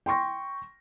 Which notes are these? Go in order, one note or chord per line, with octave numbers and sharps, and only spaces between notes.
G5 C6 C#6 A#6